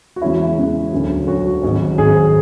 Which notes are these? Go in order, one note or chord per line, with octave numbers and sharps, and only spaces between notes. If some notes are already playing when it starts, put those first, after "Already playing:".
F#4
E2 C#3 G#3 C#4 E4
E2 C#3 G#3 C#4
D2 C#3 F#3
D2 C#3 F#3 F#4
G#1 G#2 F#3 C#4
G#1 G#2 F#3 C#4 G#4